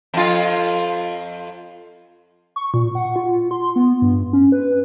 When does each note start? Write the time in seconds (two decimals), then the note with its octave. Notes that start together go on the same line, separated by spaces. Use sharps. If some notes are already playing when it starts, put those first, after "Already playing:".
0.14 F2 F4
2.56 C#6
2.74 A#2
2.95 F#5
3.16 F4
3.51 C6
3.76 B3
4.02 G2
4.33 C#4
4.52 B4